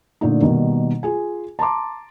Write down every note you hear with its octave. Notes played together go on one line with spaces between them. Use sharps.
A#2 D3 A3 C#4 D#4
B2 D#3 G3 A#3
F4 G#4 G#5
A5 A#5 C6 D6